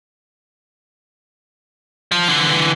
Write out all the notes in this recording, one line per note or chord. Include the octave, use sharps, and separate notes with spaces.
F3
D3 E3